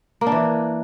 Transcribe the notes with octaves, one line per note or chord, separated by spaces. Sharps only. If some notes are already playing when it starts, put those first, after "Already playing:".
A#3
D4
E3